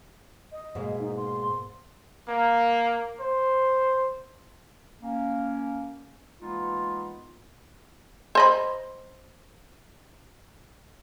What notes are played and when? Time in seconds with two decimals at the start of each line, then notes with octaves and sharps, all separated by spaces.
0.52 D#5
0.75 G#2 B2 A#3
1.00 D#4
1.17 C6
2.29 A#3
3.20 C5
5.02 A#3 C#4
6.41 E3 G#3 A#3 B3 D#4 F4
8.35 C5 D#5 B5